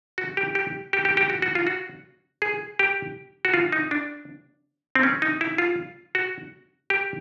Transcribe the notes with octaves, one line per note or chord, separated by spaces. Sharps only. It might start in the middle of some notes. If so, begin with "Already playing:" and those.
F#4
G4
G4
G4
G4
G4
F#4
F#4
F4
F#4
G#4
G4
F#4
F4
D#4
D4
C4
C#4
D#4
E4
F4
F#4
G4